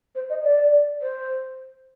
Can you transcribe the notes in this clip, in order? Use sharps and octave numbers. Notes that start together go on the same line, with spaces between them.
C5
D#5
D5
C5